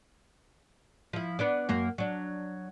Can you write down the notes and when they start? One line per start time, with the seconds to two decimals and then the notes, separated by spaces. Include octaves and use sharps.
1.13 F3 E4
1.39 B3 D4 D5
1.69 F#2 A#3 F#4
1.98 F#3 D4